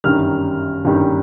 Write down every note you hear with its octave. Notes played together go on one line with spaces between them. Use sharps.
G1 F#2 D#3 G3 F6
G1 F#2 D#3 G3